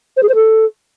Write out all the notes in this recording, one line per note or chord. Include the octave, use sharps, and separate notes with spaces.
C5
G#4
C5
A4